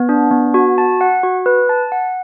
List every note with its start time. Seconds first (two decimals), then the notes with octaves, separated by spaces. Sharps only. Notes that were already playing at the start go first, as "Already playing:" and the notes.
Already playing: B3
0.09 D4
0.31 B3
0.54 F#4
0.78 A5
1.01 F#5
1.23 F#4
1.46 B4
1.69 A5
1.92 F#5